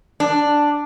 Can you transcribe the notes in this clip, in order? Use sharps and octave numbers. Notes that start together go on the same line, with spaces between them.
D4